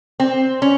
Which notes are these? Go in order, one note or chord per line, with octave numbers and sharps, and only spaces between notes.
C4
C#4